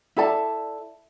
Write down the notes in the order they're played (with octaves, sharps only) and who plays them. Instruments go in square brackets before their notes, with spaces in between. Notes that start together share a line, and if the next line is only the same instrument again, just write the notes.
[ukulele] E4 A4 D5 A5